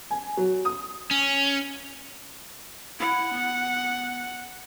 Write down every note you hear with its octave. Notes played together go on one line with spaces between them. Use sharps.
G#5
F#3
D#6
C#4
E4 F#5
B3